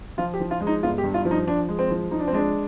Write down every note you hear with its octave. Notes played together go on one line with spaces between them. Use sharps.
F3 F4
G4
F3
F4
G#3
D#4
G1 F4
G4
G2
F4
F3
D#4
F3 D4
G#3
C4
F3
F3 D#4
D4
C4
G#3 D4